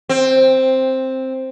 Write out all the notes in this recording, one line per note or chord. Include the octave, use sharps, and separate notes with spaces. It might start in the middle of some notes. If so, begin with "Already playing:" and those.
C4